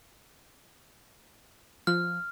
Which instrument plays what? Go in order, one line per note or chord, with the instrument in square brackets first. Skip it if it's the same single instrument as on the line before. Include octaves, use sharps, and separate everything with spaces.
[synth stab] F3 [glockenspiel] F6